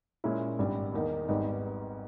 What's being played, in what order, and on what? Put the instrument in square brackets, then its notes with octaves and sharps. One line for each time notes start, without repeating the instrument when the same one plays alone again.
[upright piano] A#2 G#3 C#4 E4
G#1 G2 G3
E2 D#3 A#3 D#4
G#1 G#2 G3 B3 D#4